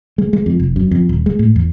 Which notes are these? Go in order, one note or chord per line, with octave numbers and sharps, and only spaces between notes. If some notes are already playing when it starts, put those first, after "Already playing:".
G#3
G#3
F2
F1
F#2
F2
D#1
G#3
A2
E2